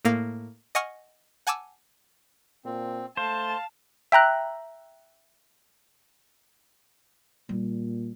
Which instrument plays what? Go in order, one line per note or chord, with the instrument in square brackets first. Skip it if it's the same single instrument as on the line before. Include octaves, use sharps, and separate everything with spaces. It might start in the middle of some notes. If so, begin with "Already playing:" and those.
[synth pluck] A2 A#3 F5 A#5
D#5 F#5 G#5 C#6 D#6 F6
F#5 G#5 A5 D6 E6
[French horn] A#2 [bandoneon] C4
[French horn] A3 [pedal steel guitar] C5 [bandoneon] F5 [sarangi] A5
[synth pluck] E5 G5 A#5 F#6
[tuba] A#2 [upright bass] G3